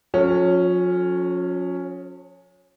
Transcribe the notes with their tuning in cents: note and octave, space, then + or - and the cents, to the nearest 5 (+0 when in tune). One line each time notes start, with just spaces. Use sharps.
F3 +45 C#4 +0 A4 -10